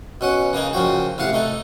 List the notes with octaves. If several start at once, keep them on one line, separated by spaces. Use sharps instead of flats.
B2 C#4 F#5
C#3 A#3 D#4 G#4
A#2 C#3 F3 F#4 G5
A1 C3 F5 F#5
A3 D#4 A4